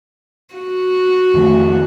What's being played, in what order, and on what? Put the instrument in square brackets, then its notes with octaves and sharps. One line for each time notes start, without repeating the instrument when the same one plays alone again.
[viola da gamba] F#4
[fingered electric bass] F2 D#3 A3